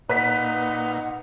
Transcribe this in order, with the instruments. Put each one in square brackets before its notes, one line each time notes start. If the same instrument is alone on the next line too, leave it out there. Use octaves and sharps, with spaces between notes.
[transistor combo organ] A#2 [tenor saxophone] D#4 [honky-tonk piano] B4 B6 [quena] F#5